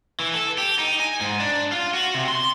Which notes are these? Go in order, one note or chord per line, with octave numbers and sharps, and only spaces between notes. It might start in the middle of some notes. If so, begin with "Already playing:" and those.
E3
A4
G4
D#4
G#5
G#2
D4
F4
F#4
C3
C6